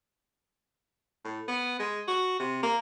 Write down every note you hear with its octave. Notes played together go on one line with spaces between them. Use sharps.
A2
B3
G#3
F#4
C3
A#3